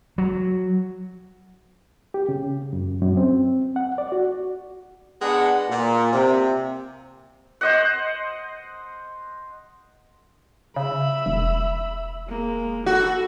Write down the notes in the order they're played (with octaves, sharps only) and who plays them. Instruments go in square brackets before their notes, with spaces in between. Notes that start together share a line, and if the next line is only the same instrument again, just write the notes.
[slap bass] F#3
[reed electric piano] G4
C#3
F#2
F#2
C4
F#5
D5
F#4
[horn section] G#3 B3 D4 F#5
A#2
C3
[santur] C5 D#5 F#5
[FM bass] C#3 [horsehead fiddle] E5 B5
[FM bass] E1
[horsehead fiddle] G#3 A#3
[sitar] F#4 [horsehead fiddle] A4 B5